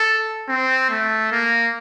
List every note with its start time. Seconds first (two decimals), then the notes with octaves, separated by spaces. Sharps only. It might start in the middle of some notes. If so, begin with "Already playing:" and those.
Already playing: A4
0.49 C4
0.90 A3
1.32 A#3